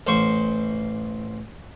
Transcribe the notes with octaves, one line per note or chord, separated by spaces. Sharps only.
A1 C5 C#6